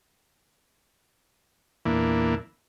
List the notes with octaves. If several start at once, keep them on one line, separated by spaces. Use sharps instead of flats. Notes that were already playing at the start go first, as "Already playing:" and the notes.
E2 A#2 E3 A#3 D4 E4